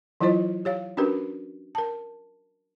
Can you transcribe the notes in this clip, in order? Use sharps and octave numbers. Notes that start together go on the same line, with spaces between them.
E3 F#3 E4 F4 C5 D#5
G4 C#5 F5
C#4 D4 F#4 G4 A#4 B4
A#4 A5